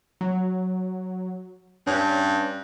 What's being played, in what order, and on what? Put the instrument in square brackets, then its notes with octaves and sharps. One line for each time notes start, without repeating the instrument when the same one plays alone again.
[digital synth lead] F#3
[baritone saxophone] G2 [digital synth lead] C#4